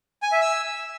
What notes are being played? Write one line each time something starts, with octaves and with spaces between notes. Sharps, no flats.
G#5
E5
E6